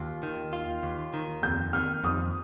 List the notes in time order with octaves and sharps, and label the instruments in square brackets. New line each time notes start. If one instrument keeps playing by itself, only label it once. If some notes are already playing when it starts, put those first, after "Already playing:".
Already playing: [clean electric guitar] D#2 F4
D#3
F4
D#2
D#3
[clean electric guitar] F2 [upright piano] G6
[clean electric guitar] D#3 [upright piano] F6
[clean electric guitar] F2 [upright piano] D#6